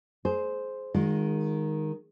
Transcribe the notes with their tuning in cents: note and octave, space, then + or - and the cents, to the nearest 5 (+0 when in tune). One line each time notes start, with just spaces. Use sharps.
G#4 +25 C5 +0
D#3 +0 G#3 -20 F4 +40